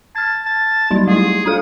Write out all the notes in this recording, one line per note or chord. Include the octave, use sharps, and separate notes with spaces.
A5 F6 G#6
A5
F#3 G3 D#4
A3 E4 G#4
D4 A4 F5 D#6